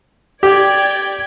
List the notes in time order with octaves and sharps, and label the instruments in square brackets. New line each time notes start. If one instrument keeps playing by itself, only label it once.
[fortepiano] G4 [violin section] D5 G5 G#6